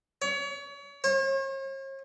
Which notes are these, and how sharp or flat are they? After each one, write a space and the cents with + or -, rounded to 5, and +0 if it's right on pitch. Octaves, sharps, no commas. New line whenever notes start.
C#5 +35
C#5 -45